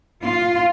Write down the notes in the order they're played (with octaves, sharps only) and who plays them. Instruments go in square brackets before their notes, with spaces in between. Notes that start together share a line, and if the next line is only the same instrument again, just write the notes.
[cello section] F4